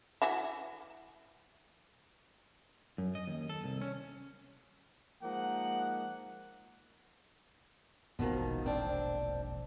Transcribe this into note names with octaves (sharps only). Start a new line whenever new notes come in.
E3 F#4 E5
F#2
D#5
D#2
A4
C2
C#4
F3 G#3 A#3 D#4 F#5
E1 A#1 B2 D#3 F3
F2 C4 D4